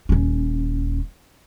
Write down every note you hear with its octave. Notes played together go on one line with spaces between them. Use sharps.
D#1 C#4